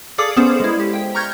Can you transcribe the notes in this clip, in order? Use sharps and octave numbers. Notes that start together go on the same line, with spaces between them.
G#4 A4 D5 F5 D6 D#6
B3 C#4 G#4 A4 C5
G#3 E4
G4
G5
A#5 C#6 F6 G6 G#6